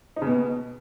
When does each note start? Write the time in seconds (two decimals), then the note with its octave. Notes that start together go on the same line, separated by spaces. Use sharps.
0.16 D#4
0.22 C#3
0.27 B2